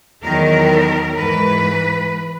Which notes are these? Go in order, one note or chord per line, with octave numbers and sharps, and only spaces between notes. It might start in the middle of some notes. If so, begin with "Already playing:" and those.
E2 D#3 F#3 A#4
G#2 E3 B4